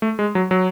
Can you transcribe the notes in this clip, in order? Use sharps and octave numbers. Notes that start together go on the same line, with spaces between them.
A3
G#3
F#3
F#3